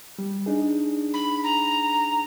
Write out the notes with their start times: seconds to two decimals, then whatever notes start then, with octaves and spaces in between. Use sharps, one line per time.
0.19 G3
0.46 D4 D#4 G#4
1.13 B5
1.43 A#5